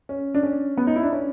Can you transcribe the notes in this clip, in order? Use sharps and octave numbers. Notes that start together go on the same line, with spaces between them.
C#4
D4
C#4
B3
D#4
E4
D4
C#4